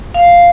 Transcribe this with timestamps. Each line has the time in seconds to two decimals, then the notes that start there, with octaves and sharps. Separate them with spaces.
0.14 F5